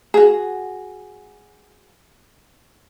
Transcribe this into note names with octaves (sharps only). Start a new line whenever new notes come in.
F#4 G#4